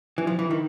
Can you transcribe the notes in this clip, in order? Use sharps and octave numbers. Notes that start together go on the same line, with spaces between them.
E3
F3
E3
D#3